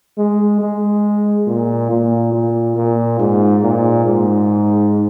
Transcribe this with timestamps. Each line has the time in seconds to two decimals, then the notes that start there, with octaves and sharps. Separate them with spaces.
0.18 G#3
0.61 G#3
1.47 A#2
1.90 A#2
2.33 A#2
2.77 A#2
3.19 G#2
3.63 A#2
4.06 G#2